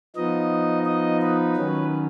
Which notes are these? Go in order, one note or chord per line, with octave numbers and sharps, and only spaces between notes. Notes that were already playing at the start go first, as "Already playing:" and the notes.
F3 B3 D#4 D#5
D#5
B4
D#3 F#3 C#4